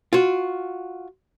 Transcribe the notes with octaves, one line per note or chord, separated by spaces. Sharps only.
F4 F#4